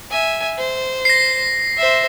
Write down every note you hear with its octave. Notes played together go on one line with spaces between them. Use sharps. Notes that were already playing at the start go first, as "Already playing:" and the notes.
E5 G#5
C5
A#6 C7
C5 E5